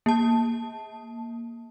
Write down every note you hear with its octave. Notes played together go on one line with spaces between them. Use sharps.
A#3 A5